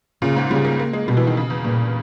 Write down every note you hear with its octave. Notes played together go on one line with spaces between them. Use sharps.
A#2 C#3
G#2
C#3 G3
A#3
A#3
G#3
B2 G3
E3
D#3
C#3
E2
G2 A#2